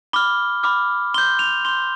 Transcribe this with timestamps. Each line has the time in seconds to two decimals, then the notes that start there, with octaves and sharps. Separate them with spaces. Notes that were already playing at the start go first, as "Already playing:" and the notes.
0.13 B5 D6 F6 G7
0.63 B5 D6 F6
1.14 C6 G6 G7
1.39 F7
1.65 C6 G6 G7